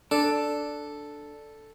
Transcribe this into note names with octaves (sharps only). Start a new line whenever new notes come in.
D4 A4